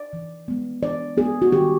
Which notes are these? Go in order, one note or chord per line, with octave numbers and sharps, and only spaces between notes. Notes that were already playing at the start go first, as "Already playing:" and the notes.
Already playing: D5
E3
G#3 B3
E3 D5
G#3 B3 G#4
F#4
D#3 G4